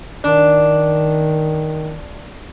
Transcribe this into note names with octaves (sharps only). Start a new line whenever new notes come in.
D#3 D4